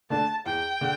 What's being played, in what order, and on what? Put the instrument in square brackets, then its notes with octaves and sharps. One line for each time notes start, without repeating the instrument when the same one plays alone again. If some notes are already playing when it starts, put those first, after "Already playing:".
[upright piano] D3 A3 D4 [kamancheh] A5
[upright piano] E2 [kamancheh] G5
[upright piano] D3